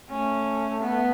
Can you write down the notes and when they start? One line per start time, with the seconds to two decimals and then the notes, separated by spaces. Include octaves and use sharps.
0.10 A3 C#4
0.80 B3